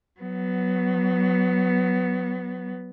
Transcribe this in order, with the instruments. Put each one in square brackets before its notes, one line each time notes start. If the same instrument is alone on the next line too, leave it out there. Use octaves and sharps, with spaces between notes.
[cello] F#3 B3